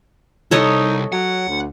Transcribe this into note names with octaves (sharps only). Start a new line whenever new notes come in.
C2 D#4 A4 C#5 D#5
F#3 F#5
D2